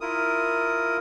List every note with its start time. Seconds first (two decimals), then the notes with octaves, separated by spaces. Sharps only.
0.01 E4 F4 A#4 D#6